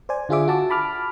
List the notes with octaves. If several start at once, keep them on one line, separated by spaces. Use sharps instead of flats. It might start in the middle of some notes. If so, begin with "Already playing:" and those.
C5 D5 G#5
D3 F4 G#4 E5 D6
F#4 A5 D6
A5 B5 D6 F6